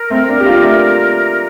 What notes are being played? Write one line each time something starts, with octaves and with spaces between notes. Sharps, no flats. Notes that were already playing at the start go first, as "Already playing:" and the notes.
Already playing: A#4
A3 C4
A#3 D4
G4
D4 F4
A3